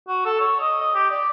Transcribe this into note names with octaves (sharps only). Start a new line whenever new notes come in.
F#4
A4
C#5
D#5
D#5
G4
D5